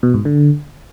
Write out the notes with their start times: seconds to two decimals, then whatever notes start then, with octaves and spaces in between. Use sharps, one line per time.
0.03 B2
0.14 G#2
0.25 D3